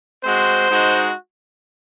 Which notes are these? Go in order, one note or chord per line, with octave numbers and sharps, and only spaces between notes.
G#3 C4 F#4 C5
G#3 D#4 F#4